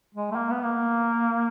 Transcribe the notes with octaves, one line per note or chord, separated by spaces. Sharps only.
G#3
A3
A#3
B3
A#3